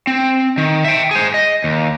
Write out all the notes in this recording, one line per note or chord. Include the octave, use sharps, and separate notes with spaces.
C4
D#3
E5 G5
G#4 C5
D#5
D#2